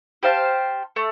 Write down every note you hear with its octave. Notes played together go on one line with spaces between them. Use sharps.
G4 C5 F5 A5
A3